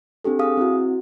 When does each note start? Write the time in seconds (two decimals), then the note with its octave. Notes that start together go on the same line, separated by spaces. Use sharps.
0.24 C4 D4 G4 A4
0.39 G#4 F5 D#6
0.57 C4 E4 F#4